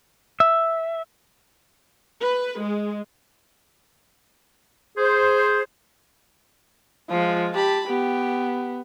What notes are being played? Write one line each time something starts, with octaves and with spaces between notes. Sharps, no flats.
E5
B4
G#3
G#4 C5
F3 G#3 F4
G4 A5 B5
B3 G4